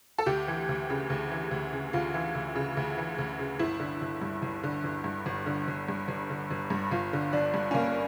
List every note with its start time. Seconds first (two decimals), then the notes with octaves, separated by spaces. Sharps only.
0.18 A4
0.26 D2 G4
0.48 E3
0.69 D2
0.90 C#3
1.10 D2
1.31 E3
1.51 D2
1.73 C#3
1.93 D2 F4
2.14 E3
2.35 D2
2.55 C#3
2.77 D2
2.98 E3
3.18 D2
3.39 C#3
3.59 G1 E4
3.80 D3
4.02 G1
4.22 G2
4.42 G1
4.64 D3
4.84 G1
5.04 G2
5.26 G1
5.46 D3
5.68 G1
5.88 G2
6.08 G1
6.30 D3
6.51 G1
6.70 G2
6.91 G1 F4
7.13 D3
7.33 G1 D4
7.54 G2
7.71 C#4
7.74 G1 A#3